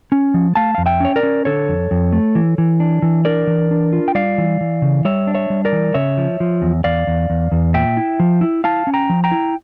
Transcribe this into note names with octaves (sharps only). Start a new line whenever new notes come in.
C#4
F3
A3 F5 A5
F2 F5
E5 G5
C#4 C#5
A#4 D5
C#4
D3 A4 C#5
F2
F2
A3
E3
E3
D4
E3
D4 A#4 D5
E3
D4
F4
G5
G3 D5 F5
E3
E3
C#3
G3 C#5 E5
D4
C#5 E5
G3
A#4 D5
E3
C#3 C#5 E5
F3
F3
E2
E2 D5 F5
E2
E2
E2
A#2 E5 G5
E4
F3
E4
E4 F5 A5
C#4
G5 A#5
F3
G5 A#5
E4